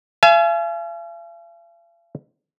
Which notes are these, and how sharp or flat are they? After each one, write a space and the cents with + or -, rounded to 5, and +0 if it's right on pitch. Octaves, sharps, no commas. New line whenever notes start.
F5 -45 G#5 +35